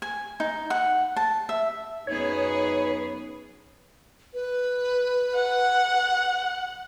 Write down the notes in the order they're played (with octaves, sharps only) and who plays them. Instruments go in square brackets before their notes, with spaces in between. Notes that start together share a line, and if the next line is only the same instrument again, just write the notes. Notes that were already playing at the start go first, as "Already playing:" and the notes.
[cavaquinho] G#5
D#4
F#5
A5
E5
[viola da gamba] F#2 B3 G#4 [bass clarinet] D#4 [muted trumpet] B4 [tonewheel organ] C#5
[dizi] B4
[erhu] F#5